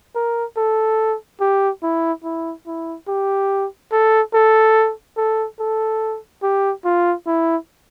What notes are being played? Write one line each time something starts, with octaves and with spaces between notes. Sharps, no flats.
A#4
A4
G4
E4
E4
E4
G4
A4
A4
A4
A4
G4
F4
E4